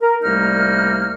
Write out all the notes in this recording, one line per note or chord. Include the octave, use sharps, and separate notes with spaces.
A#4
C2 G3 A3 A#3 D#4 F6